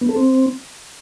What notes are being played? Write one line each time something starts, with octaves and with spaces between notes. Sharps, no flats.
B3
A4
C4